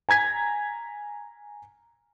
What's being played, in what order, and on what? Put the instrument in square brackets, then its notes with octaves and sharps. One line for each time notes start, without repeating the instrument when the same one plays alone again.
[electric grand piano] G#5 A#5 G#6 B6